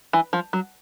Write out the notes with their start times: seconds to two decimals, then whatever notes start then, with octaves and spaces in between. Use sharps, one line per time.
0.13 E3
0.33 F3
0.53 F#3